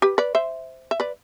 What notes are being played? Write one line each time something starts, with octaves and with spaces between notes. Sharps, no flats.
G4 B4
B4 D5
C5 E5
E5
B4 D5